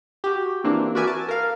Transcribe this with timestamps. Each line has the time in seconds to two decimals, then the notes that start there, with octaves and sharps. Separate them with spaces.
0.24 F#4 G4
0.64 E3 A#3 C4 D4
0.95 F#4 A#4 B4 D5 E5 G#5
1.07 A5
1.28 A#4 F5